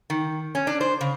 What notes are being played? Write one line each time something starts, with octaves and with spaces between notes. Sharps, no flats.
D#3
C#4
D4
C5
C#3